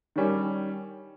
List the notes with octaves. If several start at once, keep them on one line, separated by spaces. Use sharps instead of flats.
D#3 G3 C#4